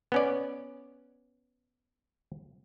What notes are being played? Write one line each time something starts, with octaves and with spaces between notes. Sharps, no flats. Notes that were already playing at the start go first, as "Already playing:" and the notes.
B3 C#4 D5